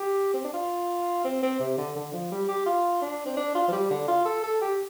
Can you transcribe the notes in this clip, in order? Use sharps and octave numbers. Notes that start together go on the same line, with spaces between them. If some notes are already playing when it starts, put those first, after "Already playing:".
Already playing: G4
C4
D4
F4
C4
C4
C3
D3
D3
F3
G3
G4
F4
D4
C4
D4
F4
F3
G3
D3
F4
A4
A4
G4